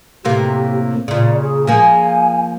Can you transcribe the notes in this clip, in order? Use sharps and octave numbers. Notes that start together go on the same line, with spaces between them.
A2 C3 A#3 G4
A#2 C#3 D5
G#4
F3 A#3 G#4 G#5